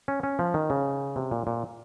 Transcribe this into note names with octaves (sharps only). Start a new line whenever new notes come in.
C#4
C#4
F3
D#3
C#3
C3
A#2
A#2